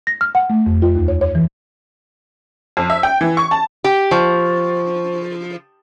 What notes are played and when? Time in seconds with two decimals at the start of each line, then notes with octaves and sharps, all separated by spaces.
0.07 A#6
0.21 F6
0.35 F#5
0.50 A3
0.66 F2
0.82 F4
0.95 D#2
1.08 C#5
1.21 C#5
1.35 E3
2.77 F2
2.90 E5
3.03 G5
3.21 E3
3.37 C#6
3.51 A5
3.84 G4
4.11 F3 C5 C#6